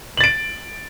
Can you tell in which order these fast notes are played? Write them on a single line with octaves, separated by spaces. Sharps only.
F#7 A6 D7